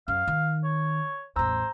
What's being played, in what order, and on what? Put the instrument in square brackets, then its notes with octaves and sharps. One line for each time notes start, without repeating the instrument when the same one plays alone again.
[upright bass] F#2 [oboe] F5
[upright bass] D#3
[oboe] C#5
[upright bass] A1 E2 [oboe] C5 [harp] A#5 E6